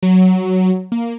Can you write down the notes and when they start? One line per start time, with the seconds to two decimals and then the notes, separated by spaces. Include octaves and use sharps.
0.03 F#3
0.92 A#3